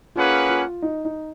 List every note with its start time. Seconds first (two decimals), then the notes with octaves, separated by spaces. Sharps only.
0.16 A#3 C#4 F4 G#4 B4 F#5
0.50 F4
0.82 D#4
1.05 D#4